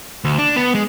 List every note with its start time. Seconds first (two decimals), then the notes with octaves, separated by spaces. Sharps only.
0.24 D2
0.38 D4
0.56 B3
0.75 G#3